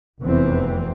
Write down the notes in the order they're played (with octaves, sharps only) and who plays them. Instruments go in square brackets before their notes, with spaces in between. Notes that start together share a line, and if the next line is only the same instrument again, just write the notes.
[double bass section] F1 E2 E3 C4